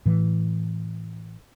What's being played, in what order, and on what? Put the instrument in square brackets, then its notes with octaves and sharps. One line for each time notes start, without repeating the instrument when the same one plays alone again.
[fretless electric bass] A2 E3